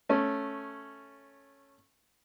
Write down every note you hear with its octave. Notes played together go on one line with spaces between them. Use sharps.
A3 C#4